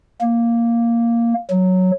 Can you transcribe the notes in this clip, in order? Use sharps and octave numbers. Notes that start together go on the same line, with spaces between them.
A#3
F#3